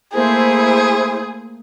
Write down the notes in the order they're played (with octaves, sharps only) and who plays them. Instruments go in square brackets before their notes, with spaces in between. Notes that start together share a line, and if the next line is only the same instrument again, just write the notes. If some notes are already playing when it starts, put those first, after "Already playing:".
[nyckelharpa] A3 A#3 [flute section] E4 C5 [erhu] G#4